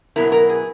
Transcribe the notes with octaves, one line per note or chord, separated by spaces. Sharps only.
B2 F#3 B3 E4 A#4
A#4
G#4